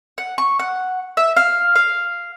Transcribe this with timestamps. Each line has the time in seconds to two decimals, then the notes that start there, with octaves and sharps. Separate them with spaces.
0.18 F#5
0.38 C#6
0.59 F#5
1.17 E5
1.36 F5
1.76 F5